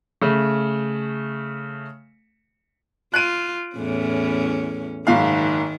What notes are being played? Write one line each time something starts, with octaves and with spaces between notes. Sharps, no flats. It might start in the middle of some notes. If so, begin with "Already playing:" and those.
C#3 A3
F4 F#6 D7 D#7
E2 A2 C#4
F#1 G#2 D#3 F5